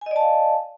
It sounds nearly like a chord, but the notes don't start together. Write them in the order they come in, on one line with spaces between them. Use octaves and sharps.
G#5 D#5 D5 A5 F5